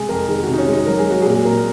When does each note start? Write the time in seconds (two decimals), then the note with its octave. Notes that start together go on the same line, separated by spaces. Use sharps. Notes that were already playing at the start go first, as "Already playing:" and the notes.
Already playing: C3 G#3 G#4
0.09 F2 A#4
0.28 D#3 G#4
0.43 F#4
0.48 C3
0.53 D#4
0.58 C#4
0.68 G#3 D#4
0.87 F#3 A#4
0.98 G#4
1.07 F#3 F#4
1.22 G#4
1.25 A#2
1.45 A#2 A#4